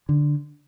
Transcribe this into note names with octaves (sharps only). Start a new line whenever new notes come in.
D3